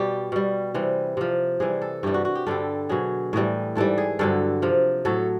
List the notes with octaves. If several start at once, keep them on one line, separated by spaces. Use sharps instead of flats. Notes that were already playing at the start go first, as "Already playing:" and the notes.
Already playing: B2 G3 G4
B2 G3
C3 E3 G3
C3 F3
C3 E3 G3 G#4
A4
G2 E3 G3 G4
F#4
F#4
G4
G2 D3 G3 A4
B2 F#3 G#4
A2 E3 G3
G#2 E3 G3 A4
G#4
G2 D3 F#3 A4
C3 F3
A2 F#3 A4